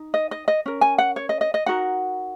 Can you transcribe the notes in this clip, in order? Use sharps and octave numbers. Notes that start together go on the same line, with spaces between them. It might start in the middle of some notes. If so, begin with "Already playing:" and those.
Already playing: D#4
D#5
D#5
D#5
C#4 A#4
G#5
F#5
C#5
D#5
D#5
D#5
D#4 F#4 A#4 F#5